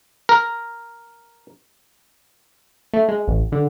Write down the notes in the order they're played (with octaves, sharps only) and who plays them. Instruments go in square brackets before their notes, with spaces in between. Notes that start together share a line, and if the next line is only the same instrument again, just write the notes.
[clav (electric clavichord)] A#4
[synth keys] A3
G#3
A1
D3